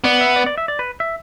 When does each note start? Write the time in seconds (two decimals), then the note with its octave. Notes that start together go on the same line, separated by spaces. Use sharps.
0.04 B3 D5
0.21 E5
0.36 D5
0.46 D5
0.58 E5
0.68 D5
0.79 B4
1.00 E5